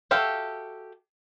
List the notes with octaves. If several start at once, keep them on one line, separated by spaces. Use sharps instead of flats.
F#4 G4 A4 E5 F5